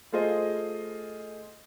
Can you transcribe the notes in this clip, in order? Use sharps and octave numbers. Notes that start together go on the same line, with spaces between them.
A3 F4 G#4 C5 D#5